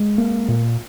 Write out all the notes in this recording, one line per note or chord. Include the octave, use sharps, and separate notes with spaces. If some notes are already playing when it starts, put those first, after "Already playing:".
Already playing: G#3
A#3
A#2